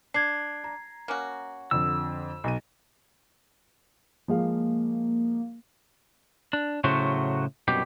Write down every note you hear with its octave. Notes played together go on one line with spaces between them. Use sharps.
D4 G#6 C7
A#5
A#3 C#4 F#4
F2 D3 E6
B1 D#7
F3 G#3 A#3 F5
D4
A2 C#3 F#3 A3 F#4 C5
C2 F#2 B2 G4